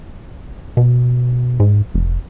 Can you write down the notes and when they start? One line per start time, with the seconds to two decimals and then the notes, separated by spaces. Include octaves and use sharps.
0.77 B2
1.60 G#2
1.94 F1